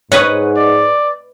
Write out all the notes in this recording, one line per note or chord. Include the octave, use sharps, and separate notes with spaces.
G#2 B4 C#5 D#5 F#5
D5